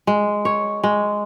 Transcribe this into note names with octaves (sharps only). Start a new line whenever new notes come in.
G#3
C#5
G#3